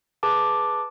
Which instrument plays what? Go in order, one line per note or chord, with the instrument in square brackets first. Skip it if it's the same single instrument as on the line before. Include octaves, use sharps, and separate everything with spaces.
[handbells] G#4 B4 A5 D6